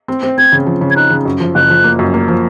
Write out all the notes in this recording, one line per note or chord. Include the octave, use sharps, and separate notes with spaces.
C4
C4
C4 G#6
C#3
F3
C#3
G#6
D#4 F#6
C#3
F#2
F3
F#1 F#6
F3
A#3
F#2
A#3
F3